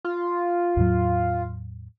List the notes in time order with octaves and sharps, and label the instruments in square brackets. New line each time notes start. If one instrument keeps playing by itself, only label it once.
[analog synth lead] F4
[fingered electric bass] E2 A2 F#3